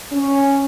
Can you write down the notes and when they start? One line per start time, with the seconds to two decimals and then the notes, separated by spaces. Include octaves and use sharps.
0.12 C#4